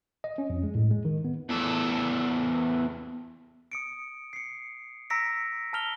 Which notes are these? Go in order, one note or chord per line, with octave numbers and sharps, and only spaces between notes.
D#5
C#4
F2
G#3
A2
G#3
D#3
B3
E2 A4
D#6 C#7 D7
C7 C#7
A#5 E6 A#6 B6 C#7 D7
A5 A#5 F6 F7 G7